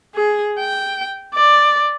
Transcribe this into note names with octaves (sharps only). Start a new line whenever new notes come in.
G#4
G5
D5